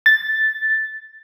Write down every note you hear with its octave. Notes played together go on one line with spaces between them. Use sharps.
A6